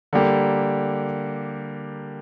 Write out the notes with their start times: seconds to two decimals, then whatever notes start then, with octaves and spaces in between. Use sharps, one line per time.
0.13 D3 G3 A#3 G4